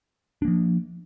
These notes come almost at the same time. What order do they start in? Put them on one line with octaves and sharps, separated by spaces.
D4 A#3 F3